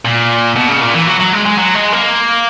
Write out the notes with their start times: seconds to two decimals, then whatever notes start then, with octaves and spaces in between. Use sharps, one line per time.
0.05 A#2
0.56 B2
0.69 C#3
0.82 A#2
0.94 E3
1.07 F#3
1.20 F#3
1.33 G#3
1.45 G#3
1.58 F#3
1.74 G#3
1.92 A#3